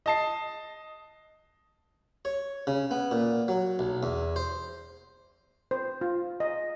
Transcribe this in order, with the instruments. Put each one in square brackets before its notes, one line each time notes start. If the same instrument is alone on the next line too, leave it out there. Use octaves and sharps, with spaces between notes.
[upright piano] D#5 A5 C7
[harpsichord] C#5
C#3
B3
A#2
F#3
B1
E2
C5
[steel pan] C5
F4
D#5